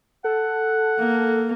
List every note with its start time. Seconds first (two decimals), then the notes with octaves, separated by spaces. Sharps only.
0.24 A4 F#5
0.99 A#3